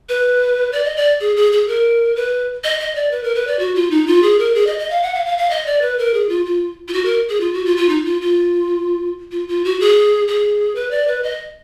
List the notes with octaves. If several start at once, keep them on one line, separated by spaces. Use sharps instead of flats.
B4
D5
D#5
D5
G#4
G#4
G#4
A#4
B4
D#5
D#5
D5
B4
A#4
B4
D5
F#4
F4
D#4
F4
G#4
A#4
G#4
D#5
D#5
F5
F#5
F5
F5
F5
D#5
D5
B4
A#4
G#4
F4
F4
F4
F#4
A#4
G#4
F4
F#4
F4
F4
D#4
F4
F4
F4
F4
F#4
G#4
G#4
B4
D5
B4
D#5